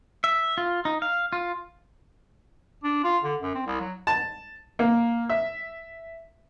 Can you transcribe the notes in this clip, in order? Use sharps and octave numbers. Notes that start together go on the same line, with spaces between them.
E5
F4
D#4
F5
F4
D4
F4
D3
F#2
C4
C2
F#3
A5
A#3
E5